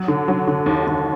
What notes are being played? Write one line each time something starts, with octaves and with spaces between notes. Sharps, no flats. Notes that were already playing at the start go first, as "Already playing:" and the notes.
Already playing: F#3
D3
F#3
D3
D#2
D#2